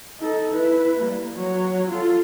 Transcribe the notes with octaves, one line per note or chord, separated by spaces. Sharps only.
D#4 A4
E4 B4
G3 A#3
F#3 C#5
F4 A4